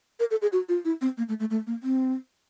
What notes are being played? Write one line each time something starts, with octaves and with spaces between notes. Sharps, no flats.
A#4
A4
G#4
F#4
F4
E4
C4
A#3
A3
A3
A3
A#3
C4